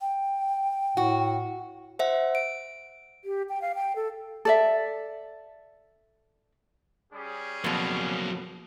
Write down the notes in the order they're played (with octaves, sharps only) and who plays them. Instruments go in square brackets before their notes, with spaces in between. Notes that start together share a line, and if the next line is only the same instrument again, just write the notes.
[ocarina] G5
[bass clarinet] A2 [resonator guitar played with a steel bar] F#4
[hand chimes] C5 E5 F#5
D7
[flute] G4
G5
F5
G5
A4
[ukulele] A4 D5 E5
[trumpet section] G3 C#4 G#4
[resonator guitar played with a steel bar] F2 B2 [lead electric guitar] F#3 A#3